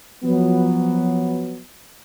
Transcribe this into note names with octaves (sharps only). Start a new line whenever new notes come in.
F3 F#3 B3